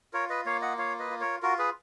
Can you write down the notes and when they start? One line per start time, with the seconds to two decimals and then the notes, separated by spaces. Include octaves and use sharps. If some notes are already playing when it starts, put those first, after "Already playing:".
0.13 F4 A#4 C#5
0.30 B4 D#5
0.46 A#3 C#5 F5
0.62 D#5 F#5
0.78 F4 C#5 F5
0.99 B4 D#5
1.10 F4
1.20 A#4 C#5
1.42 F4 F#4 A#4
1.58 G#4 B4